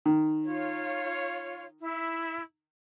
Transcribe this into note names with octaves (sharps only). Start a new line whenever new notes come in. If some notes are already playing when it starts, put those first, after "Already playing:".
D#3
F4 C#5
E4